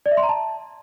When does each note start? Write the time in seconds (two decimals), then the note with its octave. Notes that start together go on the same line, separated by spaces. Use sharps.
0.06 D5
0.11 E5
0.17 C6
0.23 A#5
0.29 A5